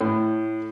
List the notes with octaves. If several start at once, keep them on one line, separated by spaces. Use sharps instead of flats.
A2